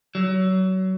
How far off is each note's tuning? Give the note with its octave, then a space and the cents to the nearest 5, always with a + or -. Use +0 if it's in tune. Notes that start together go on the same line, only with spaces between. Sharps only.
F#3 +25